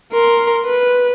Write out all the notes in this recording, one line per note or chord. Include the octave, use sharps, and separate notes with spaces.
A#4 C6
B4